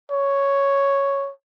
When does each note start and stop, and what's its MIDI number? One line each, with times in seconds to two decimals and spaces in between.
0.12 1.30 73